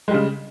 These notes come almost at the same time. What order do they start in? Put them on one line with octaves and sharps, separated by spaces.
G#3 G3 C#3